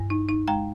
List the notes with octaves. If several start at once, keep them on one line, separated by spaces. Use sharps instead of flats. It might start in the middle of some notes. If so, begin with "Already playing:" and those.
Already playing: G2
D#4
D#4
G#3 G5 A#5